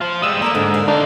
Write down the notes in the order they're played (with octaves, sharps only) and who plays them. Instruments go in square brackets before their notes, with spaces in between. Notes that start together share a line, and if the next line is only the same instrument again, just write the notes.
[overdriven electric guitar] F4 C5
[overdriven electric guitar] G3 G#3 [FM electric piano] D#6 E6
[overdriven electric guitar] A#3 [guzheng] A4 D5 B5
[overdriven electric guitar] G#2 [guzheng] D3
[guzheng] A#4 D5 F5
[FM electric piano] D4 [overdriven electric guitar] D#4 F4